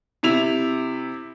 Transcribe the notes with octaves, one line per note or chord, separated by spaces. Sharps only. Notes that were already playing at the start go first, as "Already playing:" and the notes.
C3 E4 F7